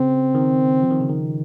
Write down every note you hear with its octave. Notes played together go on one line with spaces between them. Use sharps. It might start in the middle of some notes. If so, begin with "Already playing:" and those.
Already playing: C#3 C4
D#3
F3
D#3
C#3
D#3